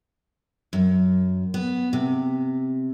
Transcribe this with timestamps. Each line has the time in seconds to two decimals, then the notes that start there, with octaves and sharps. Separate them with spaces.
0.73 F#2
1.54 B3
1.93 C3